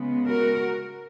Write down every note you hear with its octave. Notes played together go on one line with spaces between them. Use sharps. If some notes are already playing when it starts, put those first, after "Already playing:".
Already playing: C#3 G#3 B3
F#4 A#4